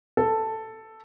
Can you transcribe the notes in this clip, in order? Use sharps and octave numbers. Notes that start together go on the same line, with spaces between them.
A4